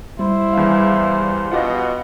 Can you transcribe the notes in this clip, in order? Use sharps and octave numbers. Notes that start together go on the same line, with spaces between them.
G3 E4 C5
E2 F5
B2 F4 G4 D#5 F#5